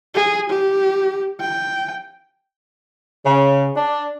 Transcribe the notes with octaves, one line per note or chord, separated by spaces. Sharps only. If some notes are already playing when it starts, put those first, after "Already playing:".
G#4
G4
G5
C#3
D4